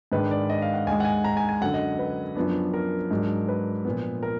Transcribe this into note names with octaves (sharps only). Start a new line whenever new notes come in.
G#2 D#3 G#3 D4 B4
D5
D#5
F5
F#5
D#2 D#3 G#3 G#5
F#5
G#5
A#5
G#5
G#5
F#2 D3 F#3 F#5
D#5
B4
F#2 F3 B3 D4
A#4
G#2 F#3 D4
B4
A#2 F3 B3
A#4